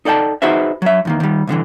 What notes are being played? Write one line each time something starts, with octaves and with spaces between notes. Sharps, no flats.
D#4 A4 D5 G5 A5
D#4 F#4 G#4 B4 C5 E5
F#3 E5
E2 D#3 A#3
D#3 G3
C2 A2 D3 E3